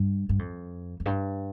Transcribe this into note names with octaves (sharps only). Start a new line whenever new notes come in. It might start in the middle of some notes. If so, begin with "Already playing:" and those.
Already playing: G2
G2
F2
F2
G2